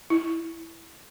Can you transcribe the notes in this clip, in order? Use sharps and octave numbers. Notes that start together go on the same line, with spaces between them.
E4